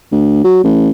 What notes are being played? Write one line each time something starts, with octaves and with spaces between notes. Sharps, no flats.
D2
F#3
A1